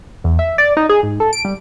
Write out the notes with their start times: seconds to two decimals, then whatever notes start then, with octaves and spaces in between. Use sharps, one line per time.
0.24 E2
0.39 E5
0.58 D5
0.77 D#4
0.89 G#4
1.03 G#2
1.20 A4
1.33 D7
1.45 G3